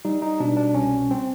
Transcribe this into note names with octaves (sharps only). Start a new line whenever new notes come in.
G3 D#4
D#4
B2 D4
D4
C2 C#4
C4